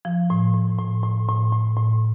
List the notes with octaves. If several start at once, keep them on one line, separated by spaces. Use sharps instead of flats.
F3
A2
A2
A2
A2
A2
A2
A2